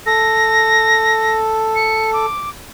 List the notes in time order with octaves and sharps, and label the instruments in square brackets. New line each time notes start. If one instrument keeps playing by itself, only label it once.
[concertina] A4 [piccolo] A#6
[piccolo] C#7
D6